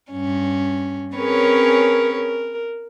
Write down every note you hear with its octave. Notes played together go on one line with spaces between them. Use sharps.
G2 C#4
C4 C#4 G#4 A#4 B4 C#5
A#4